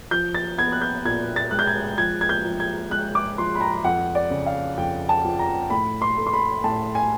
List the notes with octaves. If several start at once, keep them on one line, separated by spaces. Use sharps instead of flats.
F3 G6
A6
B3 G#6
F#6
G6
A#2 G#6
A6
G#3 F#6
G6
G#6
F3 G#6
G#6
G6
F3
G#6
G#3 F#6
D6
F3 C6
B5
A#5
F2 F#5
D5
C#3
F5
F2 G5
A5
F3
A#5
A2 B5
C6
A3
C6
B5
A2 A5
G#5